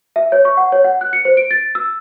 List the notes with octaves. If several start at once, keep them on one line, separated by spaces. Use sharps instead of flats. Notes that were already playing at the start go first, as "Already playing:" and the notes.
E5
C#5
C#6
F#5
C#5
F#5
F#6
C#7
C5
D7
A6
E6